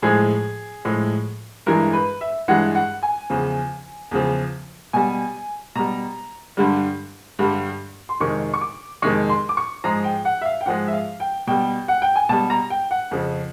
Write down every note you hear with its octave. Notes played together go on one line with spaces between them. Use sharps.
A2 F3 G#3 G#4
A2 F3 G#3
G2 E3 G#3 A#4
B4
E5
G2 E3 G#3 F#5
F#5
G#5
E2 C#3 F3
E2 C#3 F3
B2 G3 G#5
B2 G3 A#5
G2 D3 G3
G2 D3 G3
C6
F2 C3 D#3 G#3 C#6
C#6
D6
F2 C3 D#3 G#3 C#6
C6
D6
C#6
G#2 F3 G#3 A#5
G5
F#5
E5
F5
G5
G#2 F3 G#3 F#5
E5
F5
G5
B2 G3 G5
F#5
G5
G#5
B2 G3 A5
A#5
G5
F#5
F2 C#3 F3